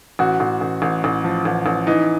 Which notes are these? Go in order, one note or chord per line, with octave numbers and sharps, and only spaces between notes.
A1 F#4
A1
A1
A1
A1
F3
A1
A1
E3 D#4